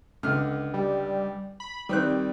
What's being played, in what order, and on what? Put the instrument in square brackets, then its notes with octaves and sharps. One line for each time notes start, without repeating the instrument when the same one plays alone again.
[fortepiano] C#2 D3 F6
[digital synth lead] G3
B5
[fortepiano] D#3 C4 F#6 [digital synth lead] G3